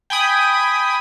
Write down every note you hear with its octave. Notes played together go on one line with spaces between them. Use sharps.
G5 G#5 B5 D#6